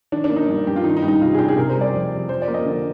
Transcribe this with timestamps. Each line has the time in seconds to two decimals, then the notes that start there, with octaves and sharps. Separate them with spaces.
0.12 D#3 D4
0.24 D4
0.30 A#3
0.36 D#4
0.49 G2
0.67 G2 G4
0.76 F4
0.84 D#3 D#4
0.97 D#4
1.02 G3
1.08 D#4
1.21 C3 F4
1.34 G#4
1.39 D4 G4
1.49 G#4
1.57 C3 A#4
1.69 C5
1.75 G3
1.81 D5
1.94 F2
2.12 F2
2.29 F3 C5
2.42 D5
2.48 A#3
2.54 D#5
2.66 D3